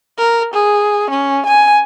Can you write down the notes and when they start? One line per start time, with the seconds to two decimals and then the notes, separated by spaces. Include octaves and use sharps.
0.18 A#4
0.54 G#4
1.10 C#4
1.46 G#5